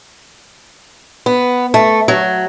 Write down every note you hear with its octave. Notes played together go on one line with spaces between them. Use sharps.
B3
A3
F#3